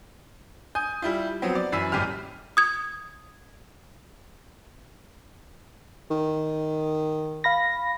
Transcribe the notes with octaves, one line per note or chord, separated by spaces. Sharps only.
G#5 D#6 G6
G3 E4 F4
F3 F#3 B3 C4
D5
F#2 E3 B5 E6 B6
D#1 G#1 F#2 G3 G4 F6
D#6 G#6
D#3
F5 B5 A#6